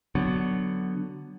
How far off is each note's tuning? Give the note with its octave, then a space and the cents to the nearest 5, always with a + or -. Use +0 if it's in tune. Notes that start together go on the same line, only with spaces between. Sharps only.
D3 +5 F#3 +10 B3 +0